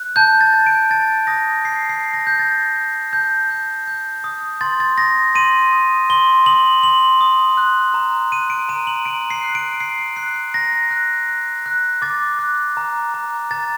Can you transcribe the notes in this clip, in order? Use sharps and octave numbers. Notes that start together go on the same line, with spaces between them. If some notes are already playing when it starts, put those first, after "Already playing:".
Already playing: F#6
A5 G6
A6
A5
D7
A5 A6
D#6 A#6
D#6 C7
C7
A5
A#6
G6
A5 A6
G6
A5 G6
G6
G6
D#6
C6 A6
A6
D#6 A#6
C6 D#7
D#6
C6 G7
D#6 F#7
C6 F#7
D#6
F#6
A#5
F#6 D#7
D7
A#5 D#7
F#7
A#5 D7
C7
F#6
D7
F#6 C7
F#6 C7
A#5 A#6
F#6
F#6
F#6
D6 A6
F#6
A#5
A#5
A#5 A6